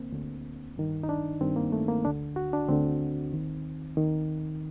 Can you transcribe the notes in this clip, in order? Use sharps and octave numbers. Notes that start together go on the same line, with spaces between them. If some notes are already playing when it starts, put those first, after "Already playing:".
Already playing: D2 D3 A#3 C4
D2 D3
G2 D#3
D#4
D4
G2 D#3 C4
A#3
A3
A#3
D2 D3 D4
F#4
D4
D2 D3 C4
D#2 D#3
D#2 D#3